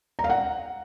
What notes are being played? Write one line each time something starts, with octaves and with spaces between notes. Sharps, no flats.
A#5
F5
F#5